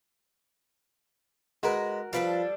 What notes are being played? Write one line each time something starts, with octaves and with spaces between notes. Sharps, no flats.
G#3 F#4 A#4 B4
F3 G3 D4 A4 B4 F5